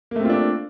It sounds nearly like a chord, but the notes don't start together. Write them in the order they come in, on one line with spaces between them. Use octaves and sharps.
A#3 A3 C4 F4 D4